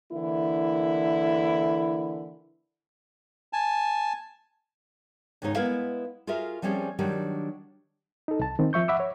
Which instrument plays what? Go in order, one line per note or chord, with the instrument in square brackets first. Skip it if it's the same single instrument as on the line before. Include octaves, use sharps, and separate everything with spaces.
[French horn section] D3 E3 A#3 E4
[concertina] G#5 A5
[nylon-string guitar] D#2 G#2 C#3 G#3 D#4 C#5
G#3 B3 E4 A#4 B4 F5
F4 F#4 G#4 A#4 E5
F3 G3 C4 C#4 G4 G#4
D#3 F#3 G3 D4
[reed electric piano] D#4 A4
C2 A5
D#3 C4
F3 E5 C#6 G6
E5 F#5 B5 D6 E6
C#5